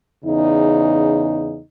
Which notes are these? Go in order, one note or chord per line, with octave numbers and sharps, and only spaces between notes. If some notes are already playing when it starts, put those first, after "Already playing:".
E2 C#3 D#4